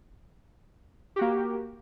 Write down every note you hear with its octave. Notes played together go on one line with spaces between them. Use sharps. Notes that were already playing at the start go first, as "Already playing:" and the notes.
A#3 F#4 G4